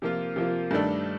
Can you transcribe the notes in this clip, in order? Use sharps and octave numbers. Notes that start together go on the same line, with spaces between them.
C3 F3 A#3 F4
C3 F3 A#3 F4
G2 D#3 A3 D4 A4